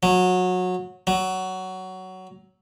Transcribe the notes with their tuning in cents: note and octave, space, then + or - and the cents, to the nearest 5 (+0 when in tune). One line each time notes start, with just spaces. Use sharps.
F#3 -20
F#3 +15